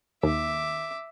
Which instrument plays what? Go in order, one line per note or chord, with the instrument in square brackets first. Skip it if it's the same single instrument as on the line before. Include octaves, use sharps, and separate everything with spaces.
[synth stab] D#2 [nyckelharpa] E5 D6